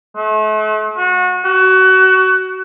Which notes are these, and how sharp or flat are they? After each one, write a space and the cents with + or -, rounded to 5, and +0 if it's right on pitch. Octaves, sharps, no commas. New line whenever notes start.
A3 -40
F#4 -30
F#4 +25